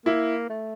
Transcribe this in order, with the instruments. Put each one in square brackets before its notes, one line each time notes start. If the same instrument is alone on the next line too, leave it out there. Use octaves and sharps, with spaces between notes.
[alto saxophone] A#3 [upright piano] E4
[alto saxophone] A3